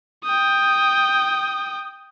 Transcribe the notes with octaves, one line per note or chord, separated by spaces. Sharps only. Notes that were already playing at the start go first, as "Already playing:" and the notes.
G5 D#6